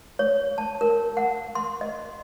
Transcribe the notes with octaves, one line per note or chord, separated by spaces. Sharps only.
C#5
A5
A#4
F#5
C6
D#5